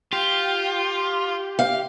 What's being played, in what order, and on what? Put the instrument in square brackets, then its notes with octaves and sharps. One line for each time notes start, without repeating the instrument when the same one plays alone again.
[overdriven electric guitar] F4 [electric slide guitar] G4
[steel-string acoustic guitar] F5